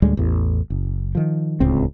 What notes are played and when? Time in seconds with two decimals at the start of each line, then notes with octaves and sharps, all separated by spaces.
0.02 D2 A2 G3 G#3
0.17 A1 E2
0.70 F#1
1.15 D#3 F3
1.60 D1 C#2 C4